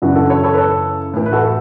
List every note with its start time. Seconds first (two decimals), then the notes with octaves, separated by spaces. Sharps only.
0.02 F#2 C#3 E3 D4 F#4
0.15 F#4 A4
0.30 A4 C#5
0.43 A4 C#5
0.54 B4
0.58 A4 C#5
1.14 A2 E3
1.26 B4
1.32 F#4 A4
1.43 F#4